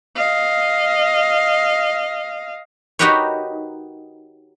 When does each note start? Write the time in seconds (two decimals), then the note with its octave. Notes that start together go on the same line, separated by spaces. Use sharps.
0.16 D#5 F5
2.99 D#4 F#4 G4 A#4 B4 C#5